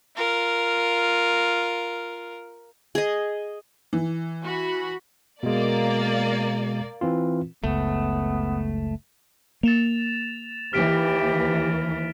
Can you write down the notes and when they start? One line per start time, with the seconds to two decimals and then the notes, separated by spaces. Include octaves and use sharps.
0.16 F4 A#4
2.95 G#4 D#5
3.93 E3
4.45 F#4 B5
5.43 B2 G#3 A#3 D5
7.01 E3 C4 F4
7.64 F#1 C#2 A3 B3
9.63 A#3 A6 E7 F7
10.73 D#2 E3 G4 F6 B6 D7